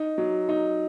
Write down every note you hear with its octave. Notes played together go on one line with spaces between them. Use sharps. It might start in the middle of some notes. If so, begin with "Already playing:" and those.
Already playing: D#4
F#3
D#4